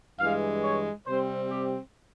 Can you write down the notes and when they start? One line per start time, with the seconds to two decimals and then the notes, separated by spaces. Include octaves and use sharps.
0.20 G2 E3 G#3 E4 F5
0.64 C#5
1.07 C3 G3 C4 C5
1.51 G4